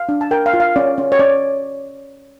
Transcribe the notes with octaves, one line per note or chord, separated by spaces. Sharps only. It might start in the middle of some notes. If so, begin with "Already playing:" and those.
Already playing: F5
D4
A5
A#4 G5
F5
F4
F5
C#4 D5
C#4
C#5
C#4 D5